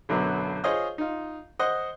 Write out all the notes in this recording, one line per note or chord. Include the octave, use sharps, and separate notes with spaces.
B1 F#2 D3 F#3 B3
F4 G#4 C5 C#5 D#5 F5
D#4 F4
C5 D#5 F#5